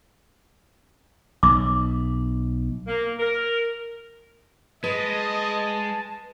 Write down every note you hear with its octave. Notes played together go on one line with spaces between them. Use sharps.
B1 D6
A#3
A#4
G#3 B4 D#5 A5